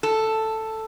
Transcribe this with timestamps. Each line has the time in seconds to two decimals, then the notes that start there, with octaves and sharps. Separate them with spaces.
0.03 A4